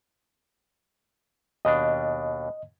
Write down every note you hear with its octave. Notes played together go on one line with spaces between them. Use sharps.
D#2 B2 D4 D#5